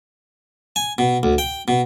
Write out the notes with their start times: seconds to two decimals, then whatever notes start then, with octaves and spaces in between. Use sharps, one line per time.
0.76 G#5
0.98 B2
1.23 D2
1.38 G5
1.68 B2